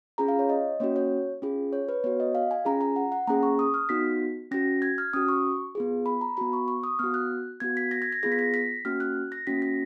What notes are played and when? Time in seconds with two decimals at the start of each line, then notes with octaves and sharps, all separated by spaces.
0.18 C#4 F4 G#4 A#5
0.28 F5
0.39 C#5
0.49 D#5
0.80 A#3 C#4 F#4 C#5
0.96 C#5
1.42 C#4 F4 G#4
1.73 C#5
1.89 B4
2.04 B3 C#5
2.06 F#4
2.20 D#5
2.35 F5
2.51 G#5
2.65 C#4 F4 G#4 A#5
2.81 A#5
2.96 F#5
3.12 F#5
3.27 A#3 C#4 G#4 A#5
3.43 C#6
3.59 D#6
3.74 F6
3.89 B3 D#4 F#4 B6
4.51 C#4 F#4 A#6
4.82 G#6
4.98 F6
5.13 C#4 F#4 D#6
5.28 C#6
5.75 B3 F4 G#4
6.06 B5
6.21 A#5
6.37 B3 F#4 B5
6.53 C#6
6.68 C#6
6.84 D#6
6.99 B3 F#4 F6
7.14 F#6
7.60 B3 F#4 G#6
7.77 B6
7.91 A#6
8.02 G#6
8.12 A#6
8.23 B3 F4 G#4 A#6
8.32 B6
8.39 A#6
8.54 B6
8.85 A#3 C#4 F#4 F6
9.00 F#6
9.32 A#6
9.47 A#3 C#4 F#4 B6
9.62 A#6